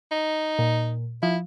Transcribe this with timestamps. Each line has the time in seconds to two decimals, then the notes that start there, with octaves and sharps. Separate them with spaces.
0.12 D#4
0.59 A#2
1.23 F3 E4